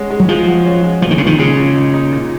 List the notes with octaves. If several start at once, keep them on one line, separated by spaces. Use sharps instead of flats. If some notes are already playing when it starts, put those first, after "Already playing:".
Already playing: G#3 C#4 F#4
G#3
F#3
F3 G#3
F#4
C#4
G#3
A#2 F3
D#3
A#2 C#3
D#3
C#3 G#3
A#2
D#4
D#4
A#2